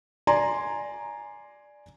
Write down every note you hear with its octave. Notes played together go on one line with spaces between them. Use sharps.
D5 G#5 A#5 C6